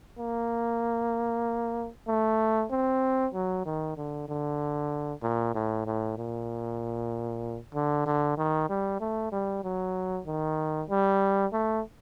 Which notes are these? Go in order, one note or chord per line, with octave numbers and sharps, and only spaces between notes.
A#3
A3
C4
F#3
D#3
D3
D3
A#2
A2
A2
A#2
D3
D3
D#3
G3
A3
G3
F#3
D#3
G3
A3